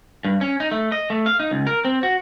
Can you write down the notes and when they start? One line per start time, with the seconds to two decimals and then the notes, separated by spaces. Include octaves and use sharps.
0.25 G2
0.41 C#4
0.60 D#4
0.71 A3
0.92 D#5
1.10 A3
1.26 F5
1.40 D#4
1.51 C#2
1.67 A#4
1.85 C4
2.03 F#4